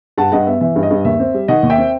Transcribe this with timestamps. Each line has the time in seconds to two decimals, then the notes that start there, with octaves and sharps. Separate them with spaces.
0.17 G2 F#5 A5
0.32 G2 D#5 F#5
0.46 B3 E5
0.61 E3 E5
0.76 G2
0.83 D#5
0.91 G2
1.05 D#2 E5
1.20 C4
1.34 G3
1.48 D#3 D#5 F#5
1.63 D#2
1.70 E5 G5
1.78 C4